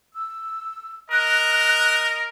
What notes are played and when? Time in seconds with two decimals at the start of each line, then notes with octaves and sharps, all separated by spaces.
0.13 E6
1.10 A#4 D#5 F#6